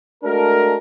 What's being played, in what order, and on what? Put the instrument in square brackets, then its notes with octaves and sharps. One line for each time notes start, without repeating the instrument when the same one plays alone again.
[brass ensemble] G#3 A3 D4 F#4 A#4